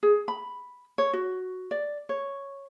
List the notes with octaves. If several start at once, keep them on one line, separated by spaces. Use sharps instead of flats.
G#4
B5
C#5
F#4
D5
C#5